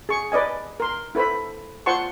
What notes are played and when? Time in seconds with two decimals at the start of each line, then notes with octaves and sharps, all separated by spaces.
0.09 G#4 C#6
0.32 B4 D5 D#5 G#5
0.80 A#4 C6
1.15 E4 A4 B4 C5 B5
1.86 F4 C5 F#5 A5 C6 C#6